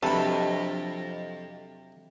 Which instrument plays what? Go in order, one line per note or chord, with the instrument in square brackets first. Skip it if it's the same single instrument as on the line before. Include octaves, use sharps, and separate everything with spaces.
[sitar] F2 [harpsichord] C3 B5 [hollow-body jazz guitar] F#3 D4 B4 [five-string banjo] A4